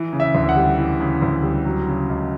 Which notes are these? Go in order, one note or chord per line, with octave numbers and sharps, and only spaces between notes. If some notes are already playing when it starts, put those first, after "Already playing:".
Already playing: E3
C#3
E5
D2
F#5
G3
E3
C#3
D2
G3
F#3
C#3
C#2